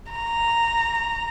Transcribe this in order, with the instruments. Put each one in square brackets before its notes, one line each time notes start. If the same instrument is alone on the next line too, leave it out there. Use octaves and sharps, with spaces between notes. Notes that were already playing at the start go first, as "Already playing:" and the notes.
[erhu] A#5